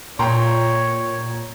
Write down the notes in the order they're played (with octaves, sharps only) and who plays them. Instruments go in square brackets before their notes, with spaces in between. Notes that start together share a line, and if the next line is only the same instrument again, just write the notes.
[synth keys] A#2 [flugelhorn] C#5 [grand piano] G5 A#5 C6